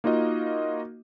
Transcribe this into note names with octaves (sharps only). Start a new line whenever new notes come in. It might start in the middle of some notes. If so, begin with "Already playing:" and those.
A#3 D#4 F4 F#4 D#5